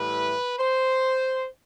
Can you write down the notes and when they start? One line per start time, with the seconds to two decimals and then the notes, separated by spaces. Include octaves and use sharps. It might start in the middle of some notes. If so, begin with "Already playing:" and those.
Already playing: A2 E3 G3 B4
0.59 C5